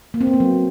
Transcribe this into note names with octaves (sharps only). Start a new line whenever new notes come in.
A#3
C4
B3
A#3
F#3